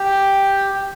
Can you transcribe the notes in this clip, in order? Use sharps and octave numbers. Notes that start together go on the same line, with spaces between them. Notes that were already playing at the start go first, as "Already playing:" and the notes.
Already playing: G4